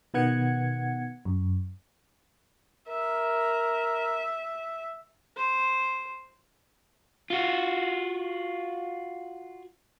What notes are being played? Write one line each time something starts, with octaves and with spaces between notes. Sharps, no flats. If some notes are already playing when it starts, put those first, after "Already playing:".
B2 D#3 B3 F#5 G#6 C#7
F#2
A#4 E5
C5
F4 F#4